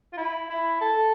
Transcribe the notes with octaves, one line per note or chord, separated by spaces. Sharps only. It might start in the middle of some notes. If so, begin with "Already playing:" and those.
F4
E4
E4
A4